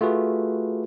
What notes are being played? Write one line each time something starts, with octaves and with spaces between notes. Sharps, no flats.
A3 F4 F#4 G#4 B4